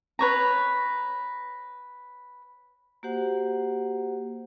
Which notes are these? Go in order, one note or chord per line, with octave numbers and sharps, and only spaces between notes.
B4 C#5 A#5
A#3 F#4 G4 C5 F#5